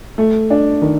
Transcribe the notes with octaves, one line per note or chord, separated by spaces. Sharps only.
A3
D4
D#3